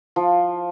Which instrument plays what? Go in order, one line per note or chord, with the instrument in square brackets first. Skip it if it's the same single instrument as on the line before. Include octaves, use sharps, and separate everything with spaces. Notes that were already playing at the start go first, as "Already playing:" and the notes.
[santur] F3